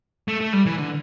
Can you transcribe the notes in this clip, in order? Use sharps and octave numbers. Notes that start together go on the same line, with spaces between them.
A3
A3
G3
E3
D3